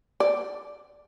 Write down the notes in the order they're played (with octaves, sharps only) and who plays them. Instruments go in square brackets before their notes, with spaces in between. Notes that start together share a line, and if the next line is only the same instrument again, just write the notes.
[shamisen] D5